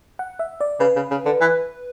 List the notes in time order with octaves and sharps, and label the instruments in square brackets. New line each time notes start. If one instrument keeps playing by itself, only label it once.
[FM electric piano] F#5
E5
D5
[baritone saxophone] C#3 [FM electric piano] B4
[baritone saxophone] C#3
C#3
D3
E3